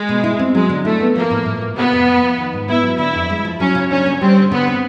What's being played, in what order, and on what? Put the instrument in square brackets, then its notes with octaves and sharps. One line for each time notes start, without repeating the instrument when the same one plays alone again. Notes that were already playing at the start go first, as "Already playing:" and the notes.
Already playing: [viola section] G#3
[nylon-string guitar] B2
E4
C4
[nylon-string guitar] F#3 [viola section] G#3
[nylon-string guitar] D3
[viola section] A3 [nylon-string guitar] E4
[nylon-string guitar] B3
[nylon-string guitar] F3 [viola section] A#3
[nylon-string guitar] A2
A2
A#3
[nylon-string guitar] C3 [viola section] B3
[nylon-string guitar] F2
A3
F3
D#3
G#2
[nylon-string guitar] B3 [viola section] E4
[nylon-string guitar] F#3
[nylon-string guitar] D3 [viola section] E4
[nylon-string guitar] F2
G#3
F3
[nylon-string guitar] F#3 [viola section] C#4
[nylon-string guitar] C#3
[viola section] C#4 [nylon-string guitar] D4
[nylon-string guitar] A#3
[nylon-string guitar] G3 [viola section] C4
[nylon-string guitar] D3
[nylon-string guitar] D3 [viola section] B3
[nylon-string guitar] C4